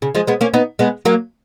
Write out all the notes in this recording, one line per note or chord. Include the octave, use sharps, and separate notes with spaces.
C#3
F3 G#3
G#3 B3
A#3 C#4
B3 D#4
G#3 B3
F#3 A#3